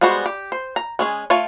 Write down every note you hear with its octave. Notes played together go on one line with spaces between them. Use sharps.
G3 G#3 B3 F#4 C5
G4
C5
A#5
G#3 C#4 G#4
A3 F4 C#5 A5